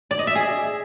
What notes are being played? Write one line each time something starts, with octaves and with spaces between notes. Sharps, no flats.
D5
D#5
E5
G#4